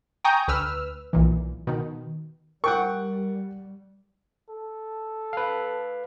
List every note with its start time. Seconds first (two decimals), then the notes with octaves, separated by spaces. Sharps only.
0.24 G5 G#5 A#5 C#6 D#6 G6
0.48 D2 B4 E6 F6
1.13 B1 A#2 E3
1.67 B2 D#3
2.64 G3 A#4 F#5 G5 C#6
4.50 A4
5.33 B4 F5